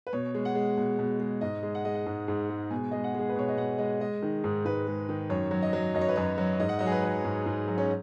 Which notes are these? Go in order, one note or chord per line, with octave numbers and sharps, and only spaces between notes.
B4
B2 C#5
G#3
F#5
G#3
B2
B2
G#3
G#2 D#5
G#3
F#5
G#3 D#5
F#5
G#2
G#2
G#3
B2 G#5
G#3 D#5
F#5
G#3 G#4
B4
B2 C#5
D#5
B2 F#5
G#3 D#5
G#3 D#5
D#3
G#2
G#2 B4
G#3
D#3
F#2 C#5
F#3
D#5
F#3
F#2 D#5
C#5
B4
F#2 C#5
F#3
G#2 D#5
F#5
F#3 D#5
G#4
B4
F#3
G#2
G#2
F#3
C#4